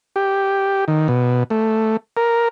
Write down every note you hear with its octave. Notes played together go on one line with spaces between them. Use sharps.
G4
D#3
B2
A3
A#4